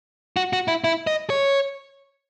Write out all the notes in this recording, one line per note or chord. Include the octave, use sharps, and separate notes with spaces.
F#4
F#4
E4
E4
D#5
C#5